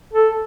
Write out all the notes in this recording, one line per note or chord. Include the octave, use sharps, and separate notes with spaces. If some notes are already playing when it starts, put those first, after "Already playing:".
A4